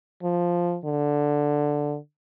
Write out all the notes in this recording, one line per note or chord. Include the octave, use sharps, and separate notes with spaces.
F3
D3